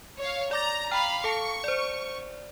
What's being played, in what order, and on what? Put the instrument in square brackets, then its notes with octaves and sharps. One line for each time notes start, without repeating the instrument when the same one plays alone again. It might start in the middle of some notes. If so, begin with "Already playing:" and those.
[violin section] C#5 F5
[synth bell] D5 D6 A6 [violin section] A#5
[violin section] F5 B5 [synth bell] G5 A#5 F6
[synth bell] A4 F5 A5 [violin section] C#6
[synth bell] C5 D5